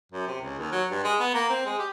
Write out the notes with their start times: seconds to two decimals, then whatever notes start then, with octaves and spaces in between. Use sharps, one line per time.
0.12 F#2
0.27 C3
0.41 C#2
0.59 D#2
0.72 F#3
0.91 G2
1.04 G#3
1.20 B3
1.34 A#3
1.50 C4
1.66 G#3
1.79 G4